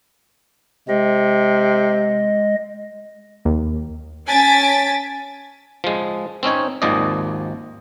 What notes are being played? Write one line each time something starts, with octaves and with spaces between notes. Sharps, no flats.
C3 G#3 D#5
D#2
C#4 G#5 A5 A6 B6 D7
F3 G#3
C4 C#4 D#4 C#5
G#1 D#2 F3 D5 D#5